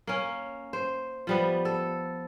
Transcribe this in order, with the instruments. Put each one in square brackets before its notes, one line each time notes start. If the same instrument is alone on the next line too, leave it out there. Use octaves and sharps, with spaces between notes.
[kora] A#3 C#4
C5
F3 G3 B3
A4